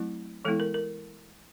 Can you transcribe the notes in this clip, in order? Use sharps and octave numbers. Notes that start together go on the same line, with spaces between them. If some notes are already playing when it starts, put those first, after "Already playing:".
Already playing: F#3 A3 C4 E4
E3 G#3 B3 E4 A4
A#4
A#4